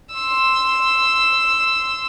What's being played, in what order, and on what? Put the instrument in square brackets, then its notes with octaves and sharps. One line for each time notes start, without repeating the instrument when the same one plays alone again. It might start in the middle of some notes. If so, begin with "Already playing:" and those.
[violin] C6 E6